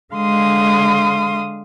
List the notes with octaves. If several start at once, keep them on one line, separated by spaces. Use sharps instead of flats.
D3 G#3 F5 C6 D#6